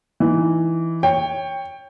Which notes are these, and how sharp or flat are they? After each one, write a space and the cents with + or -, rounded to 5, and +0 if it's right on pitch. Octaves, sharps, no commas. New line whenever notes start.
E3 +0 D#4 +0
C#5 +0 G5 +15